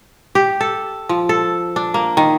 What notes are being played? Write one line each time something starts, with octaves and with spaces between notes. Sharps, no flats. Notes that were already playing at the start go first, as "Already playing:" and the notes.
G4
A4
F3
A4
D4
A#3
D#3